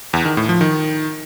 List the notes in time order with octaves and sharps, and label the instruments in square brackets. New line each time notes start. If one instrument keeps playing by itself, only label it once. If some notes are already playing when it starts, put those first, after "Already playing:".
[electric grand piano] E2
D#3
A2
F3
D#3